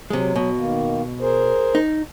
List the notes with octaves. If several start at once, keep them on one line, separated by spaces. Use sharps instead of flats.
C3 F#3 G#3
B2
D#3 A#3
G#4 A#4 C5
D#4